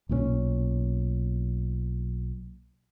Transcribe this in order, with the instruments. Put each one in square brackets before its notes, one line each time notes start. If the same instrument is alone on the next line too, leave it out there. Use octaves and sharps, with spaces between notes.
[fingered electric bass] B1 A#2 E3 C#4